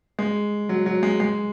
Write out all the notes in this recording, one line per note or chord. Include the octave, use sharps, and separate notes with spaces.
G#3
F#3
F#3
G#3
G#3